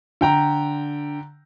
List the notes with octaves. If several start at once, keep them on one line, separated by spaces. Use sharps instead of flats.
D3 G5 A#5